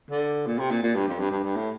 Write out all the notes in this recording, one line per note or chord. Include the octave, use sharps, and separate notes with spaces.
D3
A#2
C3
A#2
A#2
G2
F2
G2
G2
G2
A2